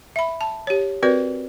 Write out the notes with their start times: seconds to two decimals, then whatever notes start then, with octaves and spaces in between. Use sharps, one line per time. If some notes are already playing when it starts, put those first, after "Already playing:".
0.16 E5 B5
0.41 A5
0.67 G4 C#5
1.03 C4 F#4 A#4 B4 D5